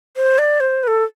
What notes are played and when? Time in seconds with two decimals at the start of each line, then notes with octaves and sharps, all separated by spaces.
0.17 C5
0.38 D5
0.60 C5
0.83 B4
0.87 A4